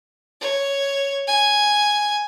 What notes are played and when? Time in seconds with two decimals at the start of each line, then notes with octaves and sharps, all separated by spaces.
0.41 C#5
1.27 G#5